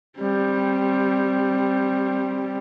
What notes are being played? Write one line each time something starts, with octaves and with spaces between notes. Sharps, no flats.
G3 C4